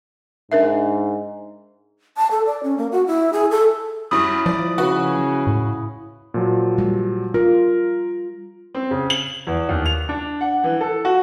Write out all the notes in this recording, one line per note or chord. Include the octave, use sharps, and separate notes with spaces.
G#2 D4 A#4 E5
A5
A4
D5
C#4
A#3
F#4
E4
G#4
A4
F#2 G3 E4 B5 C#6 D#6
F3 D5
C#3 C#4 F#4 B4
A2
A#2 F3 F#3
G3
F4 A#4
C4
C#3
F#7
E2
D#2
F7
D4
F#5
E3
A4
F#4